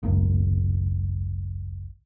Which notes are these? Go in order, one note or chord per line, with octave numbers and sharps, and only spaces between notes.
G#1 C#2 F#2